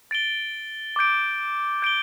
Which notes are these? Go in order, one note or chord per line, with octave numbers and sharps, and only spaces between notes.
A6 D7 G7
D6 G6 D7
G6 D7 G7